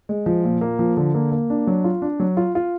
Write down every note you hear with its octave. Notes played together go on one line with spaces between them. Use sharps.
G#3
F3
A#2
A#3
F3
D3
A#3
A#3
D4
F#3
F4
D4
F#3
F4
F4